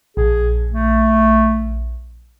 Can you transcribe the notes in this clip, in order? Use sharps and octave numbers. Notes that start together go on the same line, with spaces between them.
A#1 G#4
A3